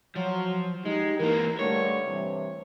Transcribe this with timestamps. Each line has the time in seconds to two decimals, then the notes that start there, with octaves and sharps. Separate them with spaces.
0.16 F3 F#3
0.85 G#3 D#4 G4
1.20 E3 A#3 A#4
1.59 G2 D3 A3 C#5
2.06 G2 C3 E3